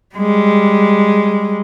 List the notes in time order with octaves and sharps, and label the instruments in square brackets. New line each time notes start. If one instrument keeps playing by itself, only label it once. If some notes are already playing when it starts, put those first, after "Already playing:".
[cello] G3 G#3